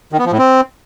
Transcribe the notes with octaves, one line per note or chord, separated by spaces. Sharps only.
D#3
B3
F3
A2
C4